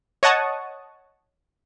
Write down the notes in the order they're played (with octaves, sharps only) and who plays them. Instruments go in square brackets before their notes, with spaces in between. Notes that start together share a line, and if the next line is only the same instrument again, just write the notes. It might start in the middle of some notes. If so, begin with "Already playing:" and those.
[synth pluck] C#5 D#5 F#5 A5 C#6 D#6